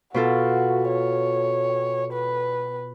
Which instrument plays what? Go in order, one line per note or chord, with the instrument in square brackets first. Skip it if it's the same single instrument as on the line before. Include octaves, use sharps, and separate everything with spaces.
[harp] B2 F4 A4 [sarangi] F#4
[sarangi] C#5
B4